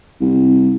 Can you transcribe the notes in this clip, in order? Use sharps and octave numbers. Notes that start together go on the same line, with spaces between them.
C2